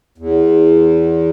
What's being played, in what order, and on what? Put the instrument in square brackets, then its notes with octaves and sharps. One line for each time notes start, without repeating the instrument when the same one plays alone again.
[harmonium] E2